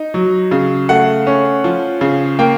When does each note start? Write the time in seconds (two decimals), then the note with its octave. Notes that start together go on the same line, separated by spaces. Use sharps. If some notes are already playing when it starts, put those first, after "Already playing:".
Already playing: D#4
0.14 F#3
0.51 C#3
0.89 A3 F#5
1.27 C#4
1.64 F3
2.01 C#3
2.39 A#3 G5